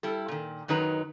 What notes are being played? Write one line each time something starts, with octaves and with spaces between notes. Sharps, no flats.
G3 E4 A4
A#2 D#3
F#2 D#3 F#3 D#4 B4 A#5